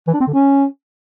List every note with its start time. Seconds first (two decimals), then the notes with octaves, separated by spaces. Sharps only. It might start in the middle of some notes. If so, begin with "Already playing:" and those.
0.07 E3
0.14 D4
0.20 C4
0.27 D3
0.33 C#4